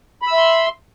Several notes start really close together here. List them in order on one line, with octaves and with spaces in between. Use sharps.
B5 E6 E5 C6